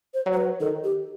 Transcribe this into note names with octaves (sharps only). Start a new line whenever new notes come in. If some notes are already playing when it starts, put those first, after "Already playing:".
C5
F#3
C5
B4
D#3 A4
G4